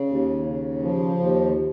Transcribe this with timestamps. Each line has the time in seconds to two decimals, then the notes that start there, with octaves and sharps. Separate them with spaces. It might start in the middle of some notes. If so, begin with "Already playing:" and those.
Already playing: C#3
0.09 D#2
0.46 C#3
0.82 F3
1.20 D#2